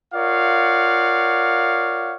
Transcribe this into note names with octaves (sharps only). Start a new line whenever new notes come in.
F4 A#4 C#5 D5 F5 F#5